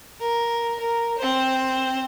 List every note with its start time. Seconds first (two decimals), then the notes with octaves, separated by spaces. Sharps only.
0.20 A#4
0.80 A#4
1.18 C4 C5